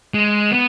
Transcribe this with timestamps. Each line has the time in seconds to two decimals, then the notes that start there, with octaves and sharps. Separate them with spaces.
0.14 G#3
0.51 B3